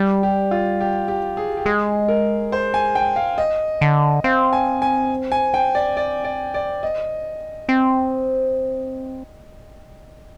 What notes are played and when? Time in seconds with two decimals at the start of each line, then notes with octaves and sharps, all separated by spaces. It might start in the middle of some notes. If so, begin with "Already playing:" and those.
Already playing: G3
0.23 G4
0.51 F4
0.81 G4
1.08 G4
1.37 G#4
1.57 G4
1.66 G#3 G#4
2.08 A#4
2.52 C5
2.74 G#5
2.95 G5
3.16 F5
3.38 D#5
3.81 D3
4.24 C4 F5
4.53 G#5
4.82 G#5
5.32 G#5
5.54 G5
5.75 D5
5.97 D5
6.24 D5
6.54 D5
6.83 D#5
7.69 C4